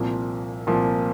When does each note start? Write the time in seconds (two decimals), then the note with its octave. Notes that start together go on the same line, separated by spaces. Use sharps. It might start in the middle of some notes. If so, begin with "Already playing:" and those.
Already playing: C2 A#2 F3 A#3
0.67 C2 A#2 F3 A#3